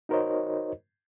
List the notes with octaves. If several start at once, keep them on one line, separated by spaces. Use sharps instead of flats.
D#4 F#4 A#4 C5 C#5 D#5